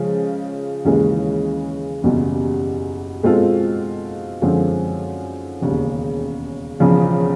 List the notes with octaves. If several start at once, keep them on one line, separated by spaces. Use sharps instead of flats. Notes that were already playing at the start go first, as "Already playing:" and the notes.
Already playing: C#3 F3 G#3
D#2 C#3 E3 G#3
F#1 E2 B2 G3
B2 G#3 C4 F4 A4
F#2 D3 F3 G#3 C4
E1 D#2 C#3
E1 E2 C#3 F3